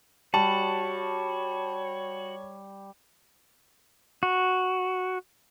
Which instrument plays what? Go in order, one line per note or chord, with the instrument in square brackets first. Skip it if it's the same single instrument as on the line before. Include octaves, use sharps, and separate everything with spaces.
[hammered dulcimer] G3 [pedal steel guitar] F#4 [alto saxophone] C#5 [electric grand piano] A5
[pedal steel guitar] F#4